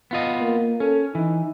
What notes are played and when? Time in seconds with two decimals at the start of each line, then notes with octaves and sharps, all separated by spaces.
0.11 B3 F4 D#5
0.41 A#3
0.80 C#4 A4
1.15 E3 D#4